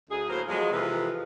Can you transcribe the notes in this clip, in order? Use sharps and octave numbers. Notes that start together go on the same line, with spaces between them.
D2 G#4
A2 F#3 A#3 A#4 C5
E2 F3 F#3 G#3
F2 C3 E3 F3 G#3 B4